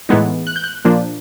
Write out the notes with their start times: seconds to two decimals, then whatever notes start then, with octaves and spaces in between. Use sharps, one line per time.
0.09 A2 E3 G#3 B3 D#4
0.47 F#6
0.56 G6
0.64 F#6
0.85 A#2 F3 A#3 D4